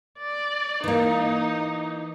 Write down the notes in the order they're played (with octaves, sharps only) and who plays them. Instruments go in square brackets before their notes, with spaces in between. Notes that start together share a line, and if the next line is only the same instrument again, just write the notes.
[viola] D5
[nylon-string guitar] E3 A#3 [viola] D#4